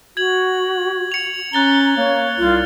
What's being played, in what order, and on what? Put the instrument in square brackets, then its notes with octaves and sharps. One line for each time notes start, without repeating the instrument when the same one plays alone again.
[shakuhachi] F#4 [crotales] G#6 F#7
[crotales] C#7 F7
[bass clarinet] C#4 [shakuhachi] A#5 [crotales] F#6 A6 G7
[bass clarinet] A#3 [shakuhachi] C#5
[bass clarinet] C2 [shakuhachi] F4